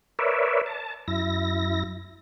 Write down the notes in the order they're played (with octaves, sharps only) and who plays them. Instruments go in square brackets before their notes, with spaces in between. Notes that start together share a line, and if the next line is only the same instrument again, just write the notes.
[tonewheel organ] A#4 B4 C#5 D5 E5
A5
F#2 E4 A#6